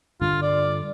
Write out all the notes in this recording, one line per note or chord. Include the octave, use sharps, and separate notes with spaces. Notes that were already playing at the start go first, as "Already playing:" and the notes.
G2 D3 F4
D5